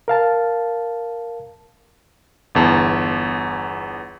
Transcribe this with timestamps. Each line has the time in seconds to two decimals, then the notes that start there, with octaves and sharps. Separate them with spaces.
0.08 A#4 F5 A5
2.55 G1 E2 A5